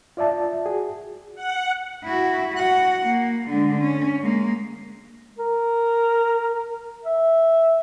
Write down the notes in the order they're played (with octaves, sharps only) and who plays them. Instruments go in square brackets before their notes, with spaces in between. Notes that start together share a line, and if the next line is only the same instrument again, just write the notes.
[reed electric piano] F4 D5 E5 A5
F#4 G#4
[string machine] F#5
[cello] E4 F#4
F#4 F#5
A#3
D3 G#3
C#4
G#3 A#3
[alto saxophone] A#4
E5